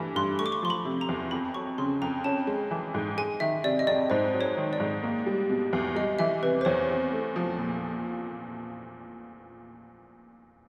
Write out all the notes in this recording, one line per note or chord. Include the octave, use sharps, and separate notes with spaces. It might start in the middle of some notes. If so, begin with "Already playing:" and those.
Already playing: G2 E3 A3
G2 C6
A3 C#6
D6
C#6
F3 C6
B5
C3
A#5
E2
F2 B5
F#3 C#6
C#3 C6
F2 A#5
C#4 A5
G#3
E3
G#2
G#3 G#5
D#3 E5
C3 D5
D#5
F2 D5
G#2 C5
F#3
C#5
D#3
D5
G#2
A#3
G3
B2
E2
G3 D#5
E3 E5
C3 B4
C5
E2 C#5
C4
A3
F3
A#2